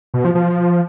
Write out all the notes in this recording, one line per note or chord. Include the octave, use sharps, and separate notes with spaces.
B2
F3
F3